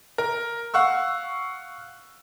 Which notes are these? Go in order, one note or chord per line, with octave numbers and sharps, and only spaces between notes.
A#4
F5 F#5 C#6 E6